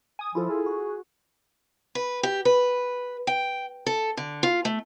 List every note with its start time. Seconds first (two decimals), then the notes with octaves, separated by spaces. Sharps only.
0.19 G#5 D#6
0.35 F3 E4 F4 A4
0.49 G#4
0.66 F#4
1.95 B4
2.23 G4
2.45 B4
3.27 G5
3.86 A4
4.17 D3
4.43 F4
4.65 A3